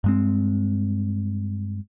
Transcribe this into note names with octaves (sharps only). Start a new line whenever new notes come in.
G2 G#3 C4